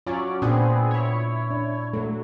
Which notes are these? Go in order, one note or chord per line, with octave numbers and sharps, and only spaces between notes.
F#3 C#4 F4 D5
A#2 B3 C4 D4 G#4
E4 C#5
D4
F#3 A3